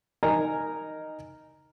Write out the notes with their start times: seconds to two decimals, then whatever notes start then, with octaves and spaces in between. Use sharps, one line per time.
0.23 D#4 A#4 G#5 A#5